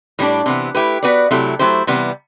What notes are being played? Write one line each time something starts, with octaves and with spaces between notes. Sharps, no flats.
A2 G3 D4
C3 E3 B3
A3 E4 G4 B4
B3 F#4 B4 D5
C3 F#3 A3 E4 G4
F#3 A3 E4 G4 C5
C3 E3 G3 B3